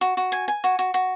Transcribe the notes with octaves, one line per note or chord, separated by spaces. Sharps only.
F#4
F#4
G#5
G#5
F#4
F#4
F#4